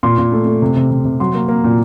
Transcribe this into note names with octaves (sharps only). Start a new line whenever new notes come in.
A#2 C6
A#2
A3
A3
C3
C3
C3
C3
F#3 C6
A#3
A#3
A#2